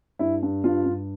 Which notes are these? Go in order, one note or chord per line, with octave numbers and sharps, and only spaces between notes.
G2 E4
G2
G2 F4
G2